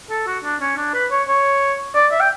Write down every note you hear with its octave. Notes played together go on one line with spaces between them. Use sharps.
A4
F#4
D4
C#4
D4
B4
C#5
C#5
D5
E5
G5